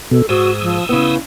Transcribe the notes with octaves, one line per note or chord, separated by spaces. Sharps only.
B2 A4
G#2 F#4 D#6 E6
F3
C#3 B3 E4